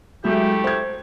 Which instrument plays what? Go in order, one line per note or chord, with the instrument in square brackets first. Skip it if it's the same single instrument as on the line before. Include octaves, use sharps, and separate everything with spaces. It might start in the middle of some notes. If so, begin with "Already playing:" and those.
[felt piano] F#3 G#3 [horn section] A3 E4 G4
[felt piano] C5 G#6